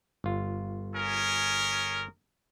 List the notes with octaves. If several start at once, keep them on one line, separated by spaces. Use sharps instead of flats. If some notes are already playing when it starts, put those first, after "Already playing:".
G1 F4
C#4 G#4 A#4